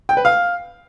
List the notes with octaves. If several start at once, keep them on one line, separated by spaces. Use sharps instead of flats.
G5
B4
F5